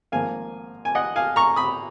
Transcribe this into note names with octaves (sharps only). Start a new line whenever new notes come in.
G#1 G#2 F3 A#3 F5 G#5
G#5
D#5 F#5
F5 G#5
A#5 C#6
B5 D#6